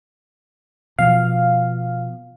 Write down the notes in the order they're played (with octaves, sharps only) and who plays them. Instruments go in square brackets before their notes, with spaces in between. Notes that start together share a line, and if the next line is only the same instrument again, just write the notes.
[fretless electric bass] B2 F3 [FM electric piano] F5